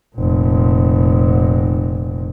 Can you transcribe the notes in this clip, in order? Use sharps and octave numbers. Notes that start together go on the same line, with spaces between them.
F1 A#2